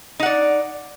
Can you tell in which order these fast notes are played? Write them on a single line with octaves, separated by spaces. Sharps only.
D#4 F#5 D5